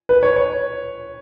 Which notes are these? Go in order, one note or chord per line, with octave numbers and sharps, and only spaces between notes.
B4
C#5
C#5